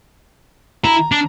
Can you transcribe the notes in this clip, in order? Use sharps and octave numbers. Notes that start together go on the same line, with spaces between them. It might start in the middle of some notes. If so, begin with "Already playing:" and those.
E4 A#5
D4